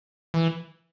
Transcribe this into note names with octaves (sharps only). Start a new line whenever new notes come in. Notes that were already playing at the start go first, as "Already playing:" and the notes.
E3